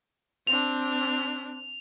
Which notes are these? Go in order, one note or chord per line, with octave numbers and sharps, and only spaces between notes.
C4 D4 F7